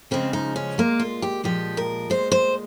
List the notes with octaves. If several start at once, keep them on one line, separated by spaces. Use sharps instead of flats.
C#3 F3 G#3 C4
D#4
C#4
A#2 G#3 A#3
F4
G4
A#2 F3 G#3 G4
A#4
A#2 G#3 C5
C5